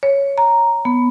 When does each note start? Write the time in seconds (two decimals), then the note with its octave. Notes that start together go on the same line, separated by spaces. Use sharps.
0.03 C#5
0.38 A#5
0.85 B3